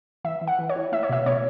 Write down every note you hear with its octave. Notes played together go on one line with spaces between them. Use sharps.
E3 E5
E3
F#5
E3
C#5
E4
A3 E5
C#5
B2 E5
B2 C#5